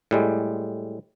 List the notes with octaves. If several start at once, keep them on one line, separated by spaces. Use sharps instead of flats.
A2 G3 G#3